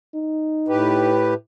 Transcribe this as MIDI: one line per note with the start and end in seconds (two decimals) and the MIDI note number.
0.15 1.11 63
0.68 1.34 45
0.68 1.34 67
0.68 1.34 71